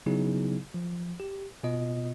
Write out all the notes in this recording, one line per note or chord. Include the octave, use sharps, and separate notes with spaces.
C#3 F#3 B3 D#4 E4 G#4
F3
G4
B2 B3 F4 D#5